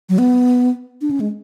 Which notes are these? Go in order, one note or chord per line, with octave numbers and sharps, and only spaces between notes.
F#3
B3
D4
C#4
G#3